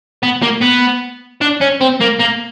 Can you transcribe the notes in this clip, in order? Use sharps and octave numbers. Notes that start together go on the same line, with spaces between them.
B3
A#3
B3
D4
C#4
C4
A#3
A#3